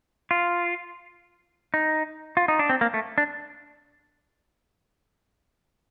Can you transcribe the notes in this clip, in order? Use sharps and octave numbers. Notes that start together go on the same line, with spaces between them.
F4
D#4
F4
D#4
D4
C4
A#3
A3
D4